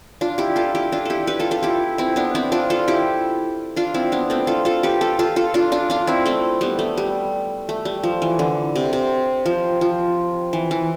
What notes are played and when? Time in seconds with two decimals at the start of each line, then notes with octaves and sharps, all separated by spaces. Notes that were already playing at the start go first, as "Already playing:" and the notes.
0.21 D4 F4
0.38 E4 G4
0.56 F4 A4
0.75 E4 G4
0.92 D4 F4
1.05 E4 G4 A4
1.27 G4 B4
1.39 F4 A4
1.51 F4 A4
1.62 E4 G4
1.98 C4 E4
2.16 B3 D4
2.35 C4 E4
2.52 D4 F4
2.70 F4 A4
2.88 E4 G4
3.76 D4 F4
3.94 C4 E4
4.12 B3 D4
4.30 A3 C4
4.47 F4 A4
4.65 F4 A4
4.83 G4 B4
5.01 F4 A4
5.19 F4 A4
5.36 F4 A4
5.54 D4 F4
5.72 D4 F4
5.90 D4 F4
6.07 C4 E4
6.26 A3 C4
6.61 G3 B3
6.79 A3
6.97 G3
7.69 A3
7.85 G3
8.03 F3
8.22 E3
8.39 D3
8.76 C3
8.93 C3
9.46 F3
9.81 F3
10.53 E3
10.71 E3